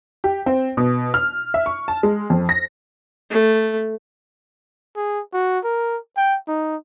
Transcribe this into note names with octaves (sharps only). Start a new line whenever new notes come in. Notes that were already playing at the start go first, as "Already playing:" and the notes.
G4
C4
B2
F6
E5
C#6
A5
G#3
F2
A#6
A3
G#4
F#4
A#4
G5
D#4